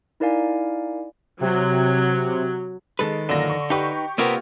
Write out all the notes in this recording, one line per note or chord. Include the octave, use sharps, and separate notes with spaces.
D#4 E4 A#4 D5 F5 G#5
C3 F#3
D#3 G#3 A4 B4
F#2 A#2 D3 A#6
C#6
D#4 G4 B4 C#6
C3 A#3 B3 F4 A#4 C#5